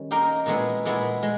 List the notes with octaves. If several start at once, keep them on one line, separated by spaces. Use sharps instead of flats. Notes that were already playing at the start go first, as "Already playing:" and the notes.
Already playing: D#3 G3 C#4
A#3 D#4 G4 A#4
A#2 G#3 B3 E4 G#4
A#2 G#3 B3 E4 G#4
G#3